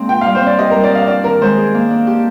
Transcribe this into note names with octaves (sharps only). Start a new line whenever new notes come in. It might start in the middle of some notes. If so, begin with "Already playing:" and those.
Already playing: G#3 A#3 C4 D4
F4 G5
F5
G3
C5
C4 D5
G4 D#5
A#4
G3
D5
D4 F5
D4 D5
D#3 A#4
G#3 C5
G#4
A#3
D4
G4